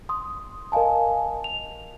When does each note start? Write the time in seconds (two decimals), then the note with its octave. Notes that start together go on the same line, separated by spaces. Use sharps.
0.09 C6 D#6
0.72 A#4 D#5 F5 G#5 A5
1.44 F7